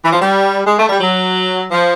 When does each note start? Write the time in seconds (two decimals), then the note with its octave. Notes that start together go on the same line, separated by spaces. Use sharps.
0.03 E3
0.12 F3
0.20 G3
0.65 G#3
0.77 A3
0.88 G3
1.00 F#3
1.71 F3